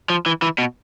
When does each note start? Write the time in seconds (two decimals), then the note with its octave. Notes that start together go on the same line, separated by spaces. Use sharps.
0.10 F3
0.26 E3
0.42 E3
0.58 B2